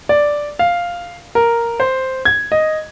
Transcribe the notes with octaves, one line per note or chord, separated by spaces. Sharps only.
D5
F5
A#4
C5
G#6
D#5